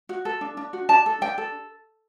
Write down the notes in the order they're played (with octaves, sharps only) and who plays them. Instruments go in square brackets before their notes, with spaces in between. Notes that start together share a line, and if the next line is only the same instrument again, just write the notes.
[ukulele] F#4
A4
D4
D4
F#4
D4 A5
A4
D4 G5
A4